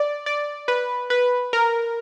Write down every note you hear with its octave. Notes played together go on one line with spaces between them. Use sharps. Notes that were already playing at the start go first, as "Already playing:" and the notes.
Already playing: D5
D5
B4
B4
A#4